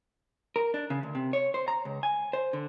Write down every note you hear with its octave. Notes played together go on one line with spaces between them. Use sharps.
A#4
D4
C#3
D2
C3
C#5
C5
A#5
C#2
G#5
C5
D3